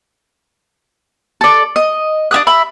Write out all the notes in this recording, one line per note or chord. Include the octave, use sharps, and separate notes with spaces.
A4 D5
D#5
D4 E5 D#6 F#6
E5 B5